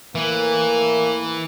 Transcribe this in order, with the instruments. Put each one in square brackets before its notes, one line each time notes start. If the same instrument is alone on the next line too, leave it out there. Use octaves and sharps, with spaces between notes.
[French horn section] A2 A#3 A#4 [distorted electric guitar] E3